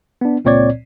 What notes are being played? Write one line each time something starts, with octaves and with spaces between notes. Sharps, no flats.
B3 D4
C#2 A#2 C4 C#5 D5 G#6